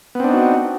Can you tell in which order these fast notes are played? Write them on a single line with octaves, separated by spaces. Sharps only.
B3 C4 D4 D#4 F#4